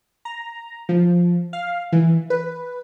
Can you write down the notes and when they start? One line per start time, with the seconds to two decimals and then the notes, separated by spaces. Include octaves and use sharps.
0.25 A#5
0.89 F3
1.53 F5
1.92 E3
2.30 B4